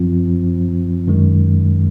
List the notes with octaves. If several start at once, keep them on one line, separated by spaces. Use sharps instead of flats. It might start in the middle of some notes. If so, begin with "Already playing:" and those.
Already playing: F#2 F3 C4 F4
F#2 D#3 G#3